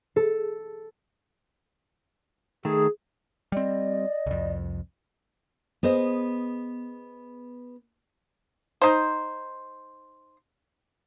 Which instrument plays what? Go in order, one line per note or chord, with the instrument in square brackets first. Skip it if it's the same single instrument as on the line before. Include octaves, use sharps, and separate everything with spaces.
[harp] A4
[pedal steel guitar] D#3 A3 [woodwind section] G#4
[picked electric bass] G3 C4 [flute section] D5 D#5
[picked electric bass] C2 F2
[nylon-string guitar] B3 G#4 C5 D#5
[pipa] D#4 C5